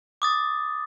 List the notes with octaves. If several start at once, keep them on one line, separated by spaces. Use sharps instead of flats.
D6 D#6 A6